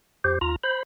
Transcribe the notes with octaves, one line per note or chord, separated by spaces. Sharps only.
F2 G4 C5
D#2 F4 A#5
C5 B5